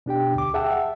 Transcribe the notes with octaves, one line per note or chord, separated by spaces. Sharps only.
B2 D4 G4 G5
D2 D6
G#4 E5 F#5 G5 A5 E6
E5